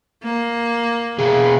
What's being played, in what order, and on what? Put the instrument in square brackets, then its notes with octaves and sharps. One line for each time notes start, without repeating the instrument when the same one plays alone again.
[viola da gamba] A#3
[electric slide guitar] B2 G#4